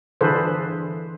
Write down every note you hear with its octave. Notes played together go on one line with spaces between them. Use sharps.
D3 E3 G#4 A4 B4 C5